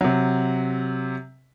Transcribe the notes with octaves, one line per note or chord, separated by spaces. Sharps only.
C3 F#3